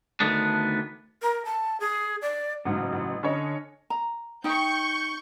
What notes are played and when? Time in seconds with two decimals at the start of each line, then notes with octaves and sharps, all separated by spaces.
0.20 D2 D#3 A3 B3 D4
1.21 A#4
1.45 A5
1.80 G#4
2.22 D5
2.65 A1 G#2 C#3 F#3
2.93 A1
3.23 D3 C#4 C#5 D#5
3.90 A#5
4.44 D#4 G5 C#6 G6